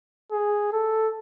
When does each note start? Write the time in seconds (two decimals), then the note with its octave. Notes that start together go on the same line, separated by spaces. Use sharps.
0.31 G#4
0.72 A4